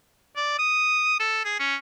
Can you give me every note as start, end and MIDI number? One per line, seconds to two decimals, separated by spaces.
0.36 0.56 74
0.59 1.18 87
1.19 1.40 69
1.44 1.57 68
1.59 1.75 61